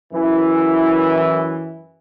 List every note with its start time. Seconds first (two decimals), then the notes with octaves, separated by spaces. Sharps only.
0.13 F#2 E3